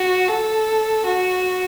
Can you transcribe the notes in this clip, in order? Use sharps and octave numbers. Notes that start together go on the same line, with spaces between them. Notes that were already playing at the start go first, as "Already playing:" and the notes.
Already playing: F#4
A4
F#4